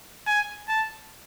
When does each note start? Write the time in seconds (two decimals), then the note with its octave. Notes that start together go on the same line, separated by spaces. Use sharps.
0.27 G#5
0.69 A5